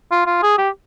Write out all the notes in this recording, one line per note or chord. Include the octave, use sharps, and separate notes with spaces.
F4
F4
G#4
G4